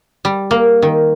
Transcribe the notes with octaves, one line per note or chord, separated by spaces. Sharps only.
G3
A#3
D#3